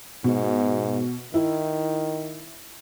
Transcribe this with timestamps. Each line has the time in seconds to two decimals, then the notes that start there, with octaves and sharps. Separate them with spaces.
0.24 G#2 B2
1.34 D#3 E4